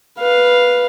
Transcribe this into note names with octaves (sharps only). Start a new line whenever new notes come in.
B4 F5